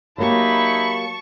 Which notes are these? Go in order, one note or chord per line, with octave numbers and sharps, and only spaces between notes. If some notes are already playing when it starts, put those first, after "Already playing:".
F#3 A#3 D#4 E4 G4 A5 B5 C#6